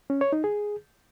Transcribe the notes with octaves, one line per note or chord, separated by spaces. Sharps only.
C#4
C#5
D#4
G#4